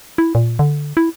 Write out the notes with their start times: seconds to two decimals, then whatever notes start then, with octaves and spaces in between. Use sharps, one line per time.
0.18 E4
0.35 A#2
0.59 D3
0.97 E4